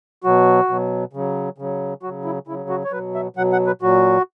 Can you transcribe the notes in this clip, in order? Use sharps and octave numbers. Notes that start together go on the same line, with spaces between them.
B2 F#3 F#4
B2 F#3
C#3 F#3
C#3 F#3
C#3 F#3 F#4
E4
C#3 F#3 E4
F#4
C#5
B2 F#3 B4
E5
B2 F#3 F#5
F#5
B4
A#2 F#3 F#4